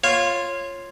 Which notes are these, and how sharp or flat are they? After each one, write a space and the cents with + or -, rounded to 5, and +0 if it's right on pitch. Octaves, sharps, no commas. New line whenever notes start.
F4 +0 C#5 -15